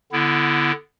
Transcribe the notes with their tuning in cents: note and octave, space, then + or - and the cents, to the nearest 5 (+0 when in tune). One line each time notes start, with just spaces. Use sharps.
D3 -5 B3 +0 E4 +15